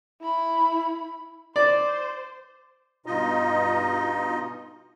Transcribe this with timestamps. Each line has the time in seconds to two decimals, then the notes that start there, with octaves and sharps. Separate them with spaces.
0.21 E4 B5
1.56 C5 D5
3.06 G2 B2 D#4 F4 D#5